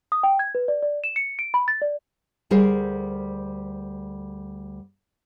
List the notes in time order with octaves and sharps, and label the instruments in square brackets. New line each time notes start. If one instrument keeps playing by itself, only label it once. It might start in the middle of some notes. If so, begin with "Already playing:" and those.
[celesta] D#6
G5
G#6
B4
D5
D5
E7
C#7
D7
B5
A6
D5
[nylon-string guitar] D2 G3 G#4 A#4 C5